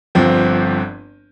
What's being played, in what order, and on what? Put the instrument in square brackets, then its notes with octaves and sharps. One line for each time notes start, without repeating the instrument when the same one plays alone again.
[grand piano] G1 G2 F3 C4